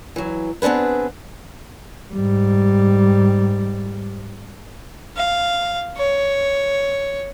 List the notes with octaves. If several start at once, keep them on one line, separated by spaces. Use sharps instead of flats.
E3 F#3
B3 C4 D4 G#4 B4
G#2 G3
F5
C#5